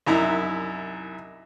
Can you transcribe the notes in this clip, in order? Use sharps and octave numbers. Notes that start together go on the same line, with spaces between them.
C2 F#2 D#4 E4 A#5